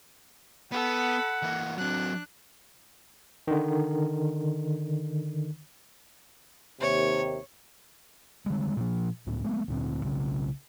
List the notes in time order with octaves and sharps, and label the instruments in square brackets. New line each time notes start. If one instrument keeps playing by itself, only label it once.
[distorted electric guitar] B3 [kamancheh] A4 B5 [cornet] F#5
[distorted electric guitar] E3 A#3
[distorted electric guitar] F#3 C4 [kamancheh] D4 F#6
[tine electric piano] D3 D#3
[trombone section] D#2 C3 [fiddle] C#5
[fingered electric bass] D3 G3 G#3
A#2 F3
C#2 A2
G#3 A3 B3
D2 A#2 C4
B1 C#3